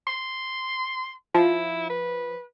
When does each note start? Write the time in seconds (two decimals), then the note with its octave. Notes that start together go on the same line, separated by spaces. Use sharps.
0.07 C6
1.35 F3 E4
1.90 B4